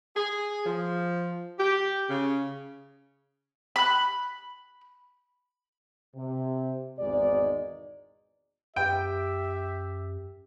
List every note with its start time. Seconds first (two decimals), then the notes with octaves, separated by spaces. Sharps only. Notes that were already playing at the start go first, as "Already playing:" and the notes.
0.15 G#4
0.65 F3
1.58 G4
2.09 C#3
3.76 B5 F#6
6.16 C3
6.99 G#1 E2 B2 G#3 D#4 D5
8.76 F#2 G4 E5 G5